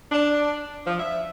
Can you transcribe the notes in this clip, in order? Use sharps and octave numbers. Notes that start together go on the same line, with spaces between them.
D4
F3
E5